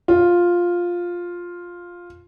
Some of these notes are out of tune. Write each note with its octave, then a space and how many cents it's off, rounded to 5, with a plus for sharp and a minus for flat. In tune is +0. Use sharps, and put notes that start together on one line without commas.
F4 +5